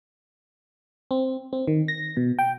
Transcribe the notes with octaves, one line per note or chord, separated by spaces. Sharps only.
C4
C4
D#3
A#6
B2
G5